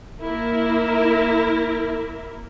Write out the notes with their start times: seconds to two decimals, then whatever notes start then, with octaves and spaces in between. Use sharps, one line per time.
0.22 A#3 E4 A#4